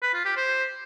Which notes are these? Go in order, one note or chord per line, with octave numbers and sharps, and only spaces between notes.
B4
F4
G4
C5